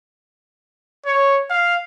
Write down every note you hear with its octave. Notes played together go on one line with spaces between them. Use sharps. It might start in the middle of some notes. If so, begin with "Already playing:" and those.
C#5
F5